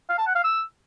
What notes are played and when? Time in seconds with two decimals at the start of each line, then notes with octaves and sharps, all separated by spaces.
0.09 F5
0.18 A5
0.27 F#5
0.35 F5
0.44 E6